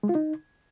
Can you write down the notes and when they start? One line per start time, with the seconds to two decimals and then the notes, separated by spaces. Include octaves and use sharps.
0.03 G#3
0.09 F4
0.15 D#4